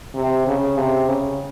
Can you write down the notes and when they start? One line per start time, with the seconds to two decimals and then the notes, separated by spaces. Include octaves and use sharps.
0.15 C3
0.47 C#3
0.77 C3
1.08 C#3